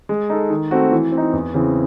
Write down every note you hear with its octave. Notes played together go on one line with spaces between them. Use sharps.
G#3
D#4 A4
D#3
A3 C4 F#4
E3
C4
D#4
E2
C#3 E3 C4